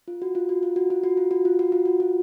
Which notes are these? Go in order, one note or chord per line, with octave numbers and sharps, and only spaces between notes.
F4
F#4
F4
F#4
F4
F#4
F4
F#4
F4
F#4
F4
F#4
F4
F#4
F4